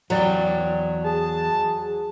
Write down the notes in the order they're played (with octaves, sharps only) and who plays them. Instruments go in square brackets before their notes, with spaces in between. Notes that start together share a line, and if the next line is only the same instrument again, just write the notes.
[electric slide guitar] E2 D5 G5 [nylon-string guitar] F#3
[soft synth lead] G#4 [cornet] A5